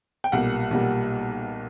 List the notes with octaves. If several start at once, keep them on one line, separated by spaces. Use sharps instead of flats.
G5
B1 A#2 G3 F#5
B1 A#2 G3